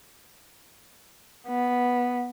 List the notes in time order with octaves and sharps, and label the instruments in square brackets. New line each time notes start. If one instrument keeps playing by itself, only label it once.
[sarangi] B3